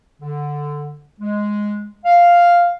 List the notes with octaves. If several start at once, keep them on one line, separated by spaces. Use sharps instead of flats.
D3
G#3
F5